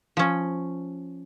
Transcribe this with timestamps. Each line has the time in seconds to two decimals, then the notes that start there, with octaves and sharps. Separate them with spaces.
0.17 F3 C#4